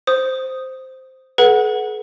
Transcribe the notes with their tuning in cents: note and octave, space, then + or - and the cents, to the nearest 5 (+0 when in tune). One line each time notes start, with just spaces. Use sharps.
C5 +0 D#6 +0
G#4 +45 B4 -25 F#5 +0